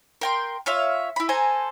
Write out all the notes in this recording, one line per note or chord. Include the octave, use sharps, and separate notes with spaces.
A#4 G5 C6
F4 C#5 E5 F5
E4 B5
A4 C5 G#5 A#5